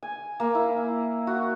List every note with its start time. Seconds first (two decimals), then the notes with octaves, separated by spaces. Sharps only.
0.03 G#5
0.40 A#3
0.55 E4
1.27 F#4